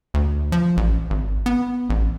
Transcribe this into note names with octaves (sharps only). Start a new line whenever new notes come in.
D2
F3
A1
G#1
B3
A1